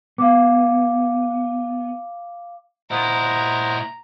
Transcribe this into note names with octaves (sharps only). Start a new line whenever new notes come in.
B3 F5 D6
A#2 E4 C5 D#5 F#5 A#5